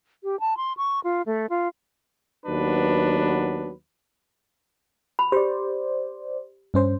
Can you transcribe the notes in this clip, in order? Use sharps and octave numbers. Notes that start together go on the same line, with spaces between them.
G4
A5
C6
C#6
F4
A3
F4
D#2 F#3 B3 D4 B4
B5
G4 C5 D5
G2 C#4 C5